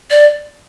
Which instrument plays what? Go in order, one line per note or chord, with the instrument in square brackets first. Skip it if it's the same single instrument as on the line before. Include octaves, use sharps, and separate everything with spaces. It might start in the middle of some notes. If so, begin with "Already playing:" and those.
[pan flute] D5